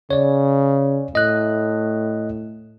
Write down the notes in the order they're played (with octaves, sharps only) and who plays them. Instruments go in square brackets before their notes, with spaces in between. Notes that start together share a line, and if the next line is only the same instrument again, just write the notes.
[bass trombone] C#3 [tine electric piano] C#5 D5
[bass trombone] A2 [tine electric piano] D#5 F#6